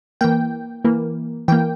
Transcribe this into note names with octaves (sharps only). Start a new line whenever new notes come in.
E3 A#3 G5
E3 A#3
E3 A#3 G5